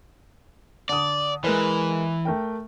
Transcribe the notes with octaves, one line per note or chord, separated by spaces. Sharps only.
D3 D5 D#6
E3 G#3 A#4 B4
A3 A#4 G5